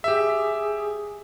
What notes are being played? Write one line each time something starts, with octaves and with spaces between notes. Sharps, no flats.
G4 G#4 E5